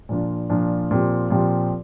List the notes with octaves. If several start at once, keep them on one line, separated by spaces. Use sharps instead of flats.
A#2 F3 D4 F4
A#2 F3 D4 F4
A#2 F3 C4 G4
A#2 F3 C4 G4